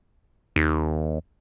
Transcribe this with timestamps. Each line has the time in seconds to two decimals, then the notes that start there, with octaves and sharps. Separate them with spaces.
0.56 D#2